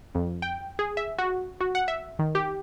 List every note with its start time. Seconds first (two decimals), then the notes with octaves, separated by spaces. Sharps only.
0.15 F2
0.42 G5
0.79 G#4
0.97 E5
1.18 F#4
1.61 F#4
1.75 F#5
1.88 E5
2.19 D#3
2.35 G4